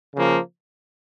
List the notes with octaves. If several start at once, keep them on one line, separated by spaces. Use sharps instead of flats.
C#3 F3 A#3